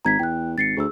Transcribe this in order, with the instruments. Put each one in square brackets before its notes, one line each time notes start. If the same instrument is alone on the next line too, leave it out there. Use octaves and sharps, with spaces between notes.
[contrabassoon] G#1 [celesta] A#5 G#6 B6
[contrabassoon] E2 [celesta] G5 F#6
[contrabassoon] G#1 [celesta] A6 C7 C#7
[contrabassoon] D2 [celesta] G#4 E6